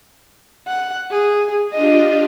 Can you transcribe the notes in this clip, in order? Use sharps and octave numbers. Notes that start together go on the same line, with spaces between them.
F#5
G#4
D4 F4 G4 D#5